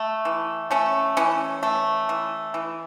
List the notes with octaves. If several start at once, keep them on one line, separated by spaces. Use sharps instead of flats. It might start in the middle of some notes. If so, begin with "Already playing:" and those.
Already playing: A3
E3
A3 C#4
E3 C#4
A3
E3
E3